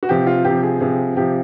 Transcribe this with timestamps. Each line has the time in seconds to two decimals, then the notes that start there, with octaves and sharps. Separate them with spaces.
0.03 F#4
0.09 C3 F3 G4
0.27 F4
0.44 C3 F3 G4
0.63 G#4
0.80 C3 F3 G#4
1.17 C3 F3 G4